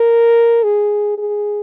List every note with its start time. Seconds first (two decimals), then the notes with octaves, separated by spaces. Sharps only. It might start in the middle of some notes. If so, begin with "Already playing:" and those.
Already playing: A#4
0.63 G#4
1.18 G#4